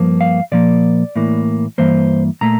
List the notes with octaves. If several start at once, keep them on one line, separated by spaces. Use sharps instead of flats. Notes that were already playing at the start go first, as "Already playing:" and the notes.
Already playing: G2 F3 A#3
F5
A#2 F3 A#3 D5
A2 E3 A#3
G2 E3 A#3 C5
A#2 A3 A#5